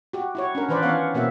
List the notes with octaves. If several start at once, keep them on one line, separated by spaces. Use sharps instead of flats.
F#4 G4
E4 F#4 C#5
C#4 D4 A#4
D#3 E3 B4 C5 D5
E3 B3 C#4 C#5 F5 F#5
B2 A#3 C4 F#4 E5